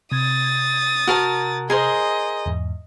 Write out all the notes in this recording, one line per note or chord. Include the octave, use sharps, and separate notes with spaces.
C3 D#6 G#6 A6
F#4 A#4 A5
G#4 A#4 C5 D#5
E2 G#2